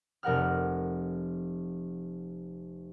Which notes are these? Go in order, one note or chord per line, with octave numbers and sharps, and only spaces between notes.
F1 A#4 F#5 F6